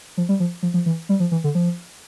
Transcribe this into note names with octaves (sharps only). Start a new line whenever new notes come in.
F3
G3
F3
F3
F3
E3
G3
F3
E3
D3
F3